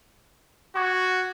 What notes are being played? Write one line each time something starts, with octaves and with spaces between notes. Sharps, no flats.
F#4 C#6 D6 G#6